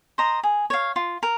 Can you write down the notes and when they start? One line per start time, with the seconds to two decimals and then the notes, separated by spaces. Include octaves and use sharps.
0.18 C5 D#5 A#5
0.43 G#4
0.70 C#5 F5
0.96 F4
1.23 A#4